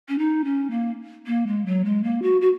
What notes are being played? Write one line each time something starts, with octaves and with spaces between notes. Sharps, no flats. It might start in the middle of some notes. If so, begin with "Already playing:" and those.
C#4
D#4
C#4
A#3
A#3
G#3
F#3
G#3
A#3
F#4
F#4